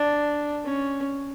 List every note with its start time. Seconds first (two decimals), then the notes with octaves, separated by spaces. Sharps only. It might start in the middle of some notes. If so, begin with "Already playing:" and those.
Already playing: D4
0.65 C#4